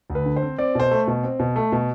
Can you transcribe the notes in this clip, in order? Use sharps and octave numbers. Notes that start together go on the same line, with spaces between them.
D2
B4
D3
C5
C4
C4 D5
B2 C5
A3
B2
C4
B2
A3
B2